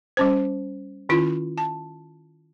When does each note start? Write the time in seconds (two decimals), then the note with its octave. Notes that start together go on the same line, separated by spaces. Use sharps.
0.17 G3 C#4 C5
1.09 D#3 C#4 E4 F4
1.58 A5